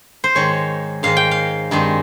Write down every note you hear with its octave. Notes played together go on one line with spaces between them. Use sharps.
C5
G#2 D#3 G#3 C#5
G#2 D#3 G#3 F5
G5
F5
G2 D#3 G#3 C4